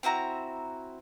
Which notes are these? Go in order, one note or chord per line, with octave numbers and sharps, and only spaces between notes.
C4 E4 F#4 A#5